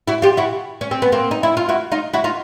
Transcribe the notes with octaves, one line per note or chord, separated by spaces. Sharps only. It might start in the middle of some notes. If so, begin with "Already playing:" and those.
E4 F#4
F4 G4
E4 F#4
C#4
C4
B3
A#3 C4
D#4
E4
F4
E4 F#4
D#4 F4
E4 F#4
D#4 F4